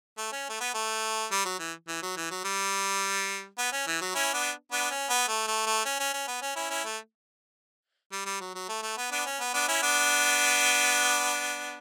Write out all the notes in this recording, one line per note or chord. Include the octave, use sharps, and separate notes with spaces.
A3
C#4
A3
B3
A3
G3
F#3
E3
E3
F#3
E3
F#3
G3
B3
C#4
E3
F#3
C#4 E4
B3 D4
B3 D4
C#4
B3
A3
A3
A3
C#4
C#4
C#4
B3
C#4
C#4 E4
C#4 E4
A3
G3
G3
F#3
F#3
A3
A3
B3
B3 D4
C#4
B3
B3 D4
C#4 E4
B3 D4